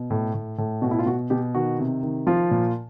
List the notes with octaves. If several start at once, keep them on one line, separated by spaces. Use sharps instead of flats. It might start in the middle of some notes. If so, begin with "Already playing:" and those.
Already playing: B2
A2
A2
A2
B2 F#4
E4
F4
B2 F#4
B2 G4
D#3 F#4
C3
D#3
F3 F4
A#2